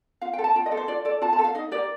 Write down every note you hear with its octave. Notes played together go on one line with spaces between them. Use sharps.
F4 F5
G5
A4
A5
F4 G5
D#5
A4
C5
F4 D5
A4 D5
F4 A5
A5
A4
F5
D#4 D#5
G4 A#4 D5